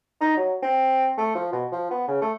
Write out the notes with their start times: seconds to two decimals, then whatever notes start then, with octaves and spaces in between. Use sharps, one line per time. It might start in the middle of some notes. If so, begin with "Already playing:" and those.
0.21 D#4
0.37 F#3
0.63 C4
1.17 A3
1.35 F3
1.52 B2
1.72 F3
1.91 B3
2.08 C#3
2.21 A3